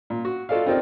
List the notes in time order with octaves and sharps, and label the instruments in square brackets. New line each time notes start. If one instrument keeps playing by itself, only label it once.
[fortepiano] A#2
F#4
F4 F#4 A4 D5 D#5 F5
C4 D#4 F4 G4 A#4 D5